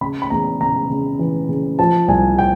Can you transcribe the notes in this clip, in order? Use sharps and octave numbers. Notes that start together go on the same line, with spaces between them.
C#3 B5
B5
E2 A#5
C#3 A#5
C#3
E3
C#3
F3 A5
C2 G#5
G5